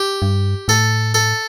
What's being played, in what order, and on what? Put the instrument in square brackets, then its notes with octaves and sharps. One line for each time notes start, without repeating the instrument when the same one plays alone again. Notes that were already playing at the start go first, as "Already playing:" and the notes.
Already playing: [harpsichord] G4
[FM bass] G2
[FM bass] A2 [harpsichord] A4
[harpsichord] A4